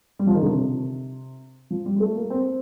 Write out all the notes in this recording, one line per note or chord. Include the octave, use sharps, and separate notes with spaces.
G3
F3
D#3
D3
C3
F3
G3
G3
A3
A#3
C4